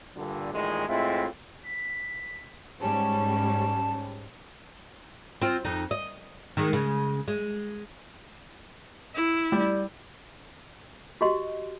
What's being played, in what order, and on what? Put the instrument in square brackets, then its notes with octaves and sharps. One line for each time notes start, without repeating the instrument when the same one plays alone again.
[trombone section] G2 A#2 D3
A1 A#2 D#3 G#3
A2 G#3 C4 E4 F4
[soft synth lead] B6
[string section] G#2 G3 C#4 [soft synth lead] A5
[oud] C4 F4
F2 D#4
D#5
D#3 G#3
C#3 G#3
G#3
[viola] E4
[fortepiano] G3 D5
[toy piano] F#4 G4 D#5 C6